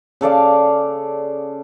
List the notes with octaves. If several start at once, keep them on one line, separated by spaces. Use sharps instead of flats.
C#3 A4 D5 F5